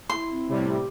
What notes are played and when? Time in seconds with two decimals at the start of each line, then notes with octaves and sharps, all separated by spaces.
0.09 E4 C6
0.30 C4
0.48 A2 C3 G3
0.68 G4